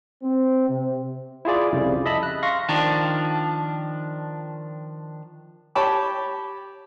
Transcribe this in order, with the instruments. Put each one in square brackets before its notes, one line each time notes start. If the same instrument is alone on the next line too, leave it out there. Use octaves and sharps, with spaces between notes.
[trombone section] C4
C3
[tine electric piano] E4 F4 G#4 D5
C2 F2 C#3 G3
D#5 E5 A5 B5
F#6
F5 C6 C#6 A#6
[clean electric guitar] D#3 F3 D4
[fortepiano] G4 C#5 G5 A5 B5 D6